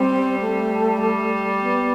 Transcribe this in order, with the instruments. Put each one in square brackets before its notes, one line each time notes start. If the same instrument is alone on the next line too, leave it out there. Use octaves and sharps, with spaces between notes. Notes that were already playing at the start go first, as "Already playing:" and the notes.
Already playing: [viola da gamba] G3 [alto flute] C4
[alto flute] A3
[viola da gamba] G3
[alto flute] B3